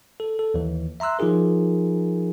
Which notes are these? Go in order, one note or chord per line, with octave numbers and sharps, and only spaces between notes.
A4
A4
D#2 E3
E5 A#5 C6 E6 F#6
F3 D#4 F4 G#4 A#4